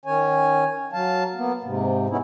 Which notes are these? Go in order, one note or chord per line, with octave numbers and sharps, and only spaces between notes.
D#3 C#4 C#5 G#5
F#3 F5 A5
A#3 B3
G#2 C3
B3 C#4 D#4 E4